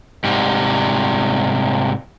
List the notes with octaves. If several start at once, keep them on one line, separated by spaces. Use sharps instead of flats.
G#2 C3 G3